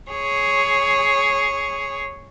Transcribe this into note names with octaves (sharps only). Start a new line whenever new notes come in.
G#4 C#5